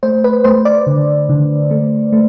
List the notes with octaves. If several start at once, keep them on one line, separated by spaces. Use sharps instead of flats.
A3 C5
B4
A3 C5
D5
D3
D3
A3
A3